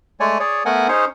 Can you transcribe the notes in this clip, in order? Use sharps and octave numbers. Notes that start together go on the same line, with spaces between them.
G#3 A3 C#5 D5 G#5
G#4 C#5 D5
A3 B3 A#4 F#5 G#5
C#4 D#4 G#4 C5 C#5